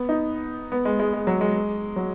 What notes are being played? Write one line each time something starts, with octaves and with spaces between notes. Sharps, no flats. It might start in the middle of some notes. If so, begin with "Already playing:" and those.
Already playing: B3
D#4
B3
G#3
G#3
G#3
F#3
G#3
F#3